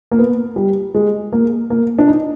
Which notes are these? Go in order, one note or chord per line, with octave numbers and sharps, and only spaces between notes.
A#3
B3
G3
G#3
A#3
A#3
D4
D#4